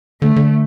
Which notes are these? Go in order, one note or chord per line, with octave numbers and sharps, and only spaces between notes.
D3 A3
D3